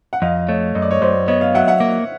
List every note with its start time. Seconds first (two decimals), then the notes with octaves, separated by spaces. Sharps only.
0.13 F#5
0.22 F2 D#5 F5
0.48 A3 C#5 D#5
0.75 F#2 D#5
0.82 D5
0.90 C#5 D#5
1.01 F#2 C5 D5
1.28 B3 C#5 D#5
1.41 D#5 F5
1.55 F#3 E5 F#5
1.67 E5 F#5
1.80 A#3